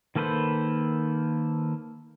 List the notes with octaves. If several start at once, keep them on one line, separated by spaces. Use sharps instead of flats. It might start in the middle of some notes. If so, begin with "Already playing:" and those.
D#3 A#3 A4 B4 C5